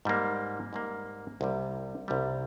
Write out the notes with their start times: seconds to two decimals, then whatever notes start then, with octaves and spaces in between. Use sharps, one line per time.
0.05 G#2 G3 A#3
0.73 G#2 G3 A#3
1.41 C2 C3 G3
2.08 C2 C3 G3